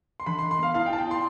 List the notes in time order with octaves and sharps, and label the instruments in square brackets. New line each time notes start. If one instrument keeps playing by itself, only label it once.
[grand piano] C6
[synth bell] E3 [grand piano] B5
[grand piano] C6
[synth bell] E3
[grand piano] C6
[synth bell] B3 [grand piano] F5
[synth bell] E4 [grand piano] F5
[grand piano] G5
[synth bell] E4 [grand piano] A5
[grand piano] G5
[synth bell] E4 [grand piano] C6